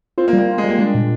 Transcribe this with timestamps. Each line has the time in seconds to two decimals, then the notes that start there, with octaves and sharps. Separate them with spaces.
0.18 C4 F4
0.28 A#3
0.33 G3
0.38 A#3
0.49 F4
0.58 G#3
0.64 G3 A#3
0.79 G#3 D4
0.94 A#2